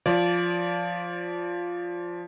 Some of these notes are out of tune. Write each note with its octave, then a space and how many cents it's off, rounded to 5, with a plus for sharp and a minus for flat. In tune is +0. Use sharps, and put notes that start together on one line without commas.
F3 +0 D5 -20